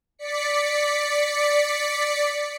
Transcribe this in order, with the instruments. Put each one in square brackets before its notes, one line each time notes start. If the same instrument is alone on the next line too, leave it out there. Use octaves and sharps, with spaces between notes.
[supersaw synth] D5 B6 C#7